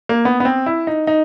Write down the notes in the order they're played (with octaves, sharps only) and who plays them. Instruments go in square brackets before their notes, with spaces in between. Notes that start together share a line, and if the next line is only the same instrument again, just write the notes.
[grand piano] A#3
B3
B3
C4
E4
D#4
D#4